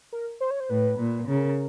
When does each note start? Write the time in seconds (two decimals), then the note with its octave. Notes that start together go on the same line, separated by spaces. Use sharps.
0.13 A#4
0.41 C5
0.51 C#5
0.60 C5
0.70 A2 B4
0.99 A#2
1.28 C#3 A#4